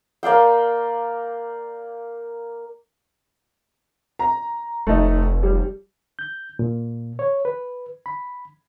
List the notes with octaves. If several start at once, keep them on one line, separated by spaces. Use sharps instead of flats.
A#3 D5 F5 G5
A#5
F1 A3 D#4
G3
G6
A#2
C#5
B4
B5